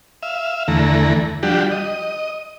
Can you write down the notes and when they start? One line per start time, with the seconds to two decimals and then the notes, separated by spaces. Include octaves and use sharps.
0.23 E5 F5
0.68 E2 D3 E3 A3 A#5
1.43 F3 G3 D4 F#4 G4
1.72 D#5